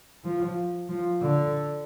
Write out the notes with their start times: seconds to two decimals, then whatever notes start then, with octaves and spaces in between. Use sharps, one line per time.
0.24 F3
0.89 F3
1.22 D3